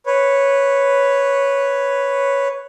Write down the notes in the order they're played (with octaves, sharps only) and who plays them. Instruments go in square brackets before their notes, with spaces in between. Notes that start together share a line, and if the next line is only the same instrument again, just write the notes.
[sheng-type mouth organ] B4 C#5